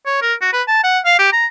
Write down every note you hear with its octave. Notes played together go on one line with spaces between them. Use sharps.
C#5
A#4
F#4
B4
A5
F#5
F5
G4
A#5